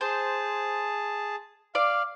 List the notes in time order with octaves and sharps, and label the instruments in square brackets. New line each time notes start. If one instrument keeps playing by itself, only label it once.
[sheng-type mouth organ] G#4 A5 [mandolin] C5
[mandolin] D5 [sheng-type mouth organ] F5